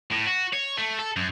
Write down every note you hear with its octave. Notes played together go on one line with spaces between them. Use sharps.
A2
F#4
C#5
A3
A4
F#2